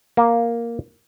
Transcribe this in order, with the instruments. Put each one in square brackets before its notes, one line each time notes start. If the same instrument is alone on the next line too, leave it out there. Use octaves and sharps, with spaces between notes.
[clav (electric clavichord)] A#3